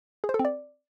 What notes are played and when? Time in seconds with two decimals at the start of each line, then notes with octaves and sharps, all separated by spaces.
0.24 G#4
0.29 C5
0.34 A4
0.39 C4
0.45 D5